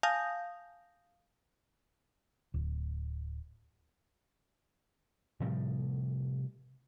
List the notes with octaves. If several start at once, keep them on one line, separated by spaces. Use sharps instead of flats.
F5 G#5 A5 D#6 G6 A#6
D1
A2 C3 F3 G3